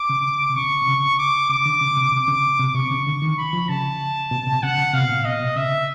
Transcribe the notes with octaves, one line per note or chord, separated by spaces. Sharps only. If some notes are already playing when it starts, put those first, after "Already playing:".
Already playing: D6
C#3
C3
C#3 C#6
C3
C#3
D6
C#3 D6
D3
C#3
C3
C3 D6
C#3
C3
C3 C#6
C#3
D3
D#3
B5
F3
C#3 A5
B2
C3
C#3 F#5
C#3
C3 F5
B2
A#2
B2 D#5
B2
C#3 E5